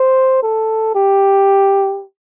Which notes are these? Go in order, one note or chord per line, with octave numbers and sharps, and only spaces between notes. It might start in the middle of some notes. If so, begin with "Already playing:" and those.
Already playing: C5
A4
G4